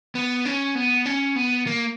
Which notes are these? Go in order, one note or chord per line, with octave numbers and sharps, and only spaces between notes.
B3
C#4
B3
C#4
B3
A#3